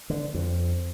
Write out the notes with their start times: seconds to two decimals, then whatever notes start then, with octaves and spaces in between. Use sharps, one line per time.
0.10 D3
0.34 F2